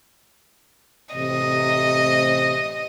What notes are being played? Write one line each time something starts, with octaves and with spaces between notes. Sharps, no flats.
A1 C3 D#5